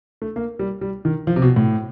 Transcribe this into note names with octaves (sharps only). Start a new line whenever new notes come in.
A3
A#3
G3
G3
D#3
F3
C3
B2
A2